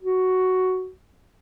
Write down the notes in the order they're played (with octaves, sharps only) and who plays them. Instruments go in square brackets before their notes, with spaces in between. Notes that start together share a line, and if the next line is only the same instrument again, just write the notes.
[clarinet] F#4